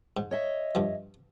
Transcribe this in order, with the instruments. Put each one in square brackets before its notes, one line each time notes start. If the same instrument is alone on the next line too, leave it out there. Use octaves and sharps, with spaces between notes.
[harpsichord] G#2
[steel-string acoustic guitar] C#5 D#5 E5
[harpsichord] G2 F3